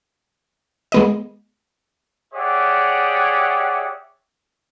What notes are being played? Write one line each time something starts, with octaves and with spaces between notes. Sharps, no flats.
G#3 B3 D#5
G4 G#4 C#5 D5 E5 F#5